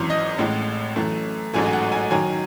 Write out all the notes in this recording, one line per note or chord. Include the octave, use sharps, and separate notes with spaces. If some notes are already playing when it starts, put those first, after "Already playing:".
Already playing: G#1 F#2 E3 C6
D#5
A1 A2 G#3
F#2 E3 A3
A1 G#2 F#3 A3 G#5
G#5
F#5
G#5
F#2 D#3 F#3 C#4 G#5